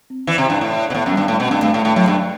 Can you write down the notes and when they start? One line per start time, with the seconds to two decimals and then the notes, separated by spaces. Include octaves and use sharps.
0.10 C4
0.27 E3 D5
0.38 C3
0.45 G2 E4
0.61 A2 E4
0.78 D5
0.90 B2
0.95 A2 B3
1.06 F#2
1.11 G3
1.17 G2
1.28 A2 A3
1.40 B2
1.46 C4
1.51 G2
1.62 G2 A3
1.74 A2
1.79 A3
1.85 A2
1.96 A2 F#3
2.08 G2
2.13 F#3